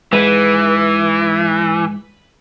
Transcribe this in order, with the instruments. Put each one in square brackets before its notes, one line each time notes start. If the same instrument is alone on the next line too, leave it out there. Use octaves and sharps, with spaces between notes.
[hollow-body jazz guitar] G#2 [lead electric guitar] E3 [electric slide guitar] B4